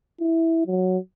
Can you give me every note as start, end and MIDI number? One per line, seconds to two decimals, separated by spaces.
0.20 0.66 64
0.67 0.98 54